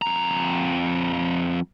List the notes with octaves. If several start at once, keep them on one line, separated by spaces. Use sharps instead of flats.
F2 A#5